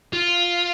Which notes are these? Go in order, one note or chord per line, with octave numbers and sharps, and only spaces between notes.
F4